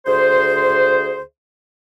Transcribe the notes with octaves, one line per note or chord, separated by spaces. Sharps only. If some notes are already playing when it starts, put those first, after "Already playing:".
D2 G#4 C5